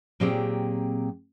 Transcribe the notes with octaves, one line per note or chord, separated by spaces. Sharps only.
A#2 F#3 C4 G4 G#4 G5